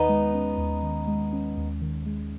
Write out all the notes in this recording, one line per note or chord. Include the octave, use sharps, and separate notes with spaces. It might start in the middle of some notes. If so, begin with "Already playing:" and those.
Already playing: D#2 D#3 B3 D#4
G#3
C#4
D#2
D#3
G#3
C#4
D#2
D#3
G#3